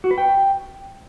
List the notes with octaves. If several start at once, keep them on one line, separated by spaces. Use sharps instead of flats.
F#4
B4
G5